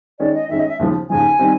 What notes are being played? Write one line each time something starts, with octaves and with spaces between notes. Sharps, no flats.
D#3 G#3 C#4 D5
D#5
D#3 G#3 C#4 E5
D#5
E5
D#2 C#3 F3
D#2 C#3 F3 G#5
D#3 G3 C4